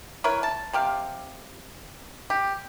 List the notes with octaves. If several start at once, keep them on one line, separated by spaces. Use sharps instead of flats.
E4 A#4 B4 C#5
A5
C3 G4 F5
G4